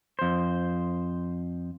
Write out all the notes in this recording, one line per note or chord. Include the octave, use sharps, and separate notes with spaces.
F2 C5